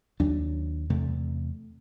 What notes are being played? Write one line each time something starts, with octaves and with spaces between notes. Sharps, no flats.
D#2 F#3 D4
E2 C3 A3